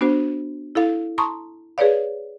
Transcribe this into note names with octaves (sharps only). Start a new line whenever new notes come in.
B3 D4 F#4 C5
E4 A4 F5
A5 A#5 C6 C#6 D#6
G#4 B4 C#5 D5 F5